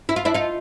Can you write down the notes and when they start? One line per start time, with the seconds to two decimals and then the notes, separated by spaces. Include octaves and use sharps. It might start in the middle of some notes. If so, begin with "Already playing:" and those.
0.09 E4
0.16 F4
0.25 D4 E4
0.34 D#4 F4